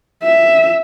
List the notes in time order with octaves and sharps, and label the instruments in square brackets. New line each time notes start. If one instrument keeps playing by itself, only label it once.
[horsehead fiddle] E5